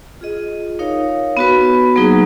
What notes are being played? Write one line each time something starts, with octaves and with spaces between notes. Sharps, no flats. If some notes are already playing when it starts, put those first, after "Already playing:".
F4 G#4 D#5
D#4 A#4 C#5 F5
B3 F#4 B4
F#3 A#3 D#4 G#4 B4